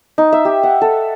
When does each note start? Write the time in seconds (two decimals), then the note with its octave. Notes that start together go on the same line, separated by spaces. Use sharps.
0.18 D#4
0.33 E5
0.45 G4
0.63 F#5
0.81 A4